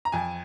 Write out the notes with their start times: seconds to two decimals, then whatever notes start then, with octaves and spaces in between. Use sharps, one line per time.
0.05 A#5
0.12 F2 G#5